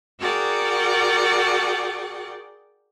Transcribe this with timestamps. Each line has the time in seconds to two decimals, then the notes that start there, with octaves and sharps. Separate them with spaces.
0.19 F#4 G#4 A#4 D5 F#5 G5